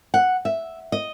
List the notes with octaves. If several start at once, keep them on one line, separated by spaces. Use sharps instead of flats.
F#5
E5
D#5